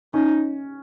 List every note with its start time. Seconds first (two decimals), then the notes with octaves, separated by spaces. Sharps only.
0.14 C#4 D#4